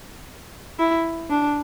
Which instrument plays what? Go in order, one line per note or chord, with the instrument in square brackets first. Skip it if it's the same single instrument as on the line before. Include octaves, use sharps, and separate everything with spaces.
[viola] E4
D4